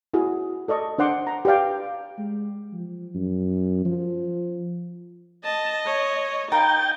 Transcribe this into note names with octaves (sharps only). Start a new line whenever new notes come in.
E4 F#4 G#4
A4 D5 D#5 C#6
D4 C5 F#5 C6 D6
A#5
G4 B4 D5 F5 G5
G#3
F3
F#2
F3
D#5 A5
C#5
D#4 A#4 F5 G5 B5 A6